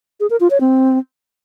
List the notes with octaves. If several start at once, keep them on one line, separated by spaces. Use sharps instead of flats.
G#4
A#4
F4
C#5
C4